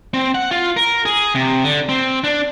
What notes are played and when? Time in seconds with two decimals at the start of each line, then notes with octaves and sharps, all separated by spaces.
0.14 C4
0.35 F#5
0.51 F4
0.77 A#4
1.05 G#4
1.35 C3
1.64 D3
1.89 C4
2.24 D4